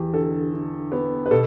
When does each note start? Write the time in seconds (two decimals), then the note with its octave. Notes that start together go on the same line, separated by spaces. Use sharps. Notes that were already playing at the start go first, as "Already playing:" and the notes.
Already playing: E2 G4
0.13 D3 A4
0.53 D3
0.92 B3
1.26 B4
1.31 B2 A4